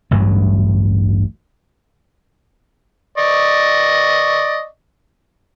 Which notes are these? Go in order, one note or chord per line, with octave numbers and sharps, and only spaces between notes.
A1 D2 G2 F#3
D5 D#5 C#6